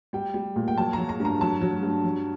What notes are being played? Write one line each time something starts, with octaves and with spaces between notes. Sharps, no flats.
G3 G5
G3
A#2
G5
F#3 A5
A#5
F#3
A#5
G2
A#5
F#3 A5
F#3
G2
F#3